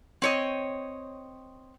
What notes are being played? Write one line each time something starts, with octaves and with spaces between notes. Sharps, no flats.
C4 C#5 D#5